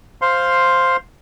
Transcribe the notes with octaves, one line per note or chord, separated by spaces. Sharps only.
C5 F5 C6